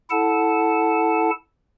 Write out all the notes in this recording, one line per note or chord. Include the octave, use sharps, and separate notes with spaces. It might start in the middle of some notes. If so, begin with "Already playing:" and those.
E4 A4 F#5 A5